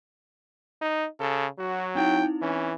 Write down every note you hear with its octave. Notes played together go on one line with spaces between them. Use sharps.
D#4
C#3 A4
F#3 F#4
C4 D#4 E4 G5
E3 C#4